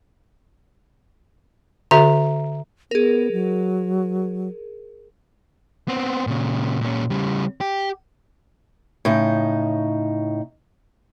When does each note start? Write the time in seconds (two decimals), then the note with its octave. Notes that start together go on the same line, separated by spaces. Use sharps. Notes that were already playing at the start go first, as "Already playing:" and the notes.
1.91 D3 F#4 A4 E5 A#5
2.91 B3 G#4 A#4
3.32 F#3
5.88 B3 C4
6.27 A#2 C#3
6.81 A#2 C#4
7.10 C#3 G3
7.61 G4
9.05 A2 C#3 D#4